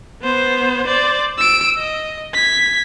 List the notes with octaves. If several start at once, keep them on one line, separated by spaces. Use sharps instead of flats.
B3 C5
C5 D5
E6 D7
D#5
G#6 B6